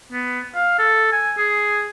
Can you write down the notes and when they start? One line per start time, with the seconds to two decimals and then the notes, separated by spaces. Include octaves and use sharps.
0.12 B3
0.55 F5
0.79 A4
1.12 G#5
1.37 G#4